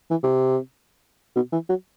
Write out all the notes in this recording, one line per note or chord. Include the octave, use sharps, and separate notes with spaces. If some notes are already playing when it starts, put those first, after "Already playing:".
E3
C3
B2
E3
F#3